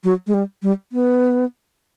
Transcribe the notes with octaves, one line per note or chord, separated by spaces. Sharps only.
F#3
G#3
G3
G3
B3